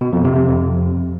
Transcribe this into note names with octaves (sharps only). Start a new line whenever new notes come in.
B2
F2
C3
C3
F2